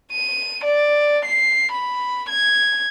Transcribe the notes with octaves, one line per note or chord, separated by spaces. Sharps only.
D#7
D5
C7
B5
G#6